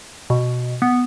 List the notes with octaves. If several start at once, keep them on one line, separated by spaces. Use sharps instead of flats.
B2
B3